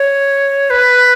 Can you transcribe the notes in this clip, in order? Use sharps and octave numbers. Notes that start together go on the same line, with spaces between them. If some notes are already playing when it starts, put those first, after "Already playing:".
Already playing: C#5
B4